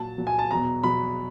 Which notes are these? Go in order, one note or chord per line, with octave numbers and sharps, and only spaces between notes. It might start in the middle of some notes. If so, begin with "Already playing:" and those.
Already playing: A#2 F#3 A5
A#2 F#3
G#5
A5
E2 B2 F#3 A#5
E2 B2 F#3 B5